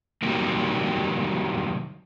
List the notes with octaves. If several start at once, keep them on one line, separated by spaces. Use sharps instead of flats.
C3 D#3 F#3 G3 A#3